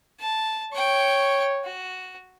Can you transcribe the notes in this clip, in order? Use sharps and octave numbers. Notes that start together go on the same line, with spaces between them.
A5
C#5 G5 C#6
F#4